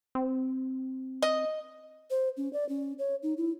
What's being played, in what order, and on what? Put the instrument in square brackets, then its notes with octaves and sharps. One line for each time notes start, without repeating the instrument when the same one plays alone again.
[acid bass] C4
[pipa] D#5
[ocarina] C5
C#4
D5
C#4
C#5
D#4
E4